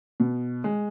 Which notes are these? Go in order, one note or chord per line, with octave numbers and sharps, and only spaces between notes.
B2
G#3